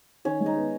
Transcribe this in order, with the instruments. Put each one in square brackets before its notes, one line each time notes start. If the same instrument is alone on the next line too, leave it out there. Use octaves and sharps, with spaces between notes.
[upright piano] D#3 [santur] C#4
[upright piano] G#3
[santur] D#4
[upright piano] B3